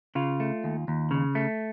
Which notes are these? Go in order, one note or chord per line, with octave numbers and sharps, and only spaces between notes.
C#3 F4
A3
D#2
D#2
C#3
A3